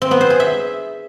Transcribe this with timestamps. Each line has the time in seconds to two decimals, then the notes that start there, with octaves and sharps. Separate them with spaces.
0.02 C4
0.11 B3
0.21 C5
0.30 G#4
0.40 E5